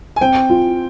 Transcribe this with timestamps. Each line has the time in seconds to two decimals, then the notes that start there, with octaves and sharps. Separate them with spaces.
0.16 G#5
0.21 C4 G5
0.50 F4